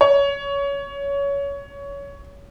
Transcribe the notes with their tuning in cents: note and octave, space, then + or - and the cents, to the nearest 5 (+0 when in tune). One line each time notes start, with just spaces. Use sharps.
C#5 +20